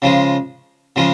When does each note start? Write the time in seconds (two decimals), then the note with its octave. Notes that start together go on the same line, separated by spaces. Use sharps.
0.02 C#3 F3 G#3
0.96 C#3 F3 G#3